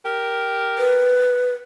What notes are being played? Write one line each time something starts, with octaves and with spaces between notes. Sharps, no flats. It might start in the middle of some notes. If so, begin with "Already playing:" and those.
G4 A#4
B4